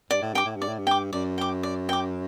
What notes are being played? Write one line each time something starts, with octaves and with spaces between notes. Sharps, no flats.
G2 D5
A2
G2 G5 D6
A2
G2
D5
A2
G2
G5 D6
F#2 D5
G5 D6
D5
G5 D6